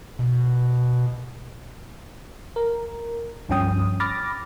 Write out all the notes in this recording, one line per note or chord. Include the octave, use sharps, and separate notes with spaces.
B2
A#4
C#2 G2 F3 C#4 G5 D#6
B5 D6 F6 A6 A#6